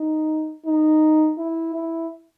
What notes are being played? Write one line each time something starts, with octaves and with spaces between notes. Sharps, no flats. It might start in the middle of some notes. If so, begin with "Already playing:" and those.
Already playing: D#4
D#4
E4
E4